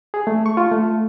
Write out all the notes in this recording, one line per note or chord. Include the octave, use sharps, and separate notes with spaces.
G#4
A3
C#6
F4
A3